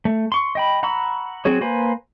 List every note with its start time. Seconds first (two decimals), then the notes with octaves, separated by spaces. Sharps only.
0.05 A3
0.32 C6 C#6
0.55 D#5 G5 B5
0.83 F#5 A#5 B5 C#6 E6
1.45 F#3 C4 F#4 G#4 C#5
1.61 A#3 B4 C5 G#5